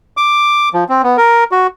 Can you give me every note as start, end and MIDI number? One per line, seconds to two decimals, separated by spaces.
0.17 0.69 86
0.74 0.84 53
0.89 1.02 60
1.03 1.17 59
1.17 1.44 70
1.52 1.67 66